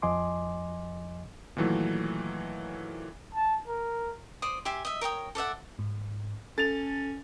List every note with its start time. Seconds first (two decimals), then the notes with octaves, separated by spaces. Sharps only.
0.02 F2 F3 D#5 G#5 C6 D6
1.57 A#2 D#3 E3 F#3 A3
3.34 A5
3.68 A#4
4.42 C5 D5 D#6
4.65 G4 E5 G#5 C6
4.85 D#5 E5
5.01 A#4 C#5 G5 D#6
5.35 A4 D5 E5 F#5
5.79 G#2
6.58 C#4 A4 A6 F7